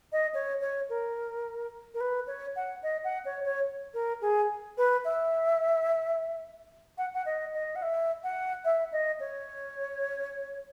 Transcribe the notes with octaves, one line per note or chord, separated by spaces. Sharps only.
D#5
C#5
C#5
A#4
A#4
B4
C#5
F#5
D#5
F#5
C#5
C#5
A#4
G#4
B4
E5
F#5
F#5
D#5
D#5
F#5
E5
F#5
E5
D#5
C#5